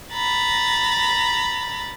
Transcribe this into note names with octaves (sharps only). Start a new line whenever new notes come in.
A#5 B5 A6